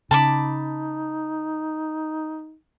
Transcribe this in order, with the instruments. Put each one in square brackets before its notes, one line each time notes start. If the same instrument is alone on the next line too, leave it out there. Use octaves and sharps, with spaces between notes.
[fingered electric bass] C#3 [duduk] D#4 [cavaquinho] A5 B5 D6